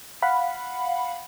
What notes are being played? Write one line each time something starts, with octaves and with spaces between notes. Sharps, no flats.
F5 F#5 B5